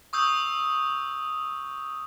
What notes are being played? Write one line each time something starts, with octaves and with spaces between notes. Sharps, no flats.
C#6 D#6 E6 G6